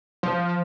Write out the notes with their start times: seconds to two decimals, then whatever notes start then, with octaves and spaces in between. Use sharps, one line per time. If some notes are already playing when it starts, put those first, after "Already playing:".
0.23 F3